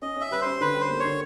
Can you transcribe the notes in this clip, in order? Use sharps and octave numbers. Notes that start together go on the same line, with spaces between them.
C#4 D#5
C#4 E5
G3 B4
C#4 C5
D3 B4
G3
C5
A#3
C#5
D3